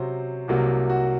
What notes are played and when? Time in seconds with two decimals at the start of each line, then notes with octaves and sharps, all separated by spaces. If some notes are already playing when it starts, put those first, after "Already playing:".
Already playing: C3 F#3 C#4 C5
0.48 C2 C3 F#3 A#3
0.89 F#4